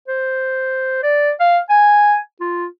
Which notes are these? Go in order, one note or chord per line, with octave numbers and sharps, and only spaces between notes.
C5
D5
F5
G#5
F4